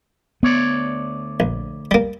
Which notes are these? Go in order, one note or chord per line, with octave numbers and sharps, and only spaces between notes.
D2 B3 C#5 D5
A#1
G3 A#3